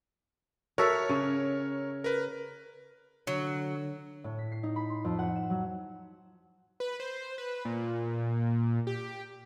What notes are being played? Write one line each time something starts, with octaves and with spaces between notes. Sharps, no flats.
F#4 A4 A#4 C#5 E5
C#3
A#4 B4
D3 F#3
A2
B6
C7
D#4
B5
C6
F2
F#5
E7
F#3
B4
C5
B4
A#2
G4